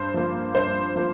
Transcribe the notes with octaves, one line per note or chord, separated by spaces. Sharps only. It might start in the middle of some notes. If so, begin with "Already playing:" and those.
Already playing: G2 C5
F3 A#3
G2 C5
F3 A#3